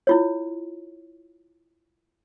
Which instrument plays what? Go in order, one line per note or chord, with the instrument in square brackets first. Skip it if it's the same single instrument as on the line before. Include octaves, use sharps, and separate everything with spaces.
[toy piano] E4 F4 C#5